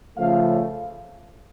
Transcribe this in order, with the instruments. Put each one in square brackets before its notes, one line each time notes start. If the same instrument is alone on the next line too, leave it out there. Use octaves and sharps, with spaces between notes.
[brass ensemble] C#3 F3 A3 F5